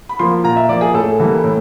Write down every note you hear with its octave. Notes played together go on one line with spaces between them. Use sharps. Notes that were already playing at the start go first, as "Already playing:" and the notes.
B5
F3 A#3 C6
A#2 A#5
E5
F3 A#3 D5
G#4
A2 A4
E3 G3 A#3
A2